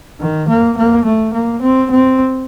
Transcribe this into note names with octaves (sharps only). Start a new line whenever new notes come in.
D#3
A#3
A#3
A3
A#3
C4
C4